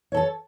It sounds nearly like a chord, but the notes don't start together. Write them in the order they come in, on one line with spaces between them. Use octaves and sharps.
C#5 A4 A5